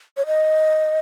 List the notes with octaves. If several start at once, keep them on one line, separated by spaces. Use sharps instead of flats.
C#5
D#5